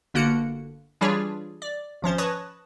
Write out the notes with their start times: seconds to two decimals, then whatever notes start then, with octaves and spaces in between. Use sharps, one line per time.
0.14 G1 D3 A#3 F#4 F#6 C#7
1.01 E3 G3 D4 F4 G#4 C#5
1.62 D5
2.02 G#1 F3 C#4 C5
2.18 B4 C#5 A5 C#6 D#6 A#6